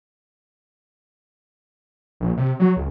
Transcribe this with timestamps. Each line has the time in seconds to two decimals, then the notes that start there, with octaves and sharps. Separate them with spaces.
2.20 A#1
2.37 C3
2.60 F#3
2.76 C#2